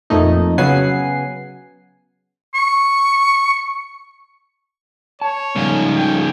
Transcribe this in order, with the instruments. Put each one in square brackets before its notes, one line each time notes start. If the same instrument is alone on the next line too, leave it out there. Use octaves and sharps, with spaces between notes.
[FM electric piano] F2 A#2 A3 D#4
C#3 F#3 B3 F#5 G#5 C7
[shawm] C#6
[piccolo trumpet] C#5 [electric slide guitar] A5
[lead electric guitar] G#2 C#3 [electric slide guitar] F3 G3
[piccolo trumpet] G5